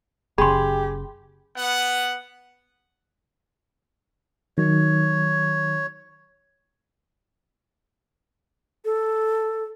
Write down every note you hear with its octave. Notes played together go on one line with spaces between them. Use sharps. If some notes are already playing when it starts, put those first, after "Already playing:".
F#1 C#3 G4 G#4 B5 C6
B3 F#5
D#3 F#3 C#5
A4